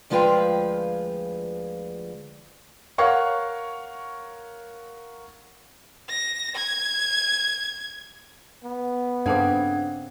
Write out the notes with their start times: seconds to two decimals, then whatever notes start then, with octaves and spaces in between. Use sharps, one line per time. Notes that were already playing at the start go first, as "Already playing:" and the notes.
0.10 D2 F3 G#3 F4 B4 G5
2.98 A#4 C#5 F5 F#5 C#6
6.09 A#6
6.55 G#6
8.64 B3
9.26 G2 C#3 C4 D4 A4 F#5 D6 G#6